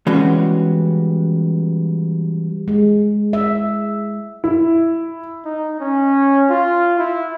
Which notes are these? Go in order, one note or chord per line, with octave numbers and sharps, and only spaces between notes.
E3 G3 G#3 B3 C#4 F#4
G#3
E5
E4
D#4
C#4
F4
E4